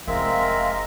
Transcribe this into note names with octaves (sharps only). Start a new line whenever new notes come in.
F1 G#3 C4 E4 A#4 E5 F5